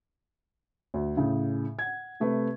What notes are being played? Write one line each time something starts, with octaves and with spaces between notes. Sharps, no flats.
D2
A2 C#3
F#5 G#6
C3 A3 B4